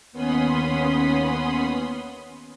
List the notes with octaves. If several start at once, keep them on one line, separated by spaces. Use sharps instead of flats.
D#2 B3 C#4 B5 C6 D#6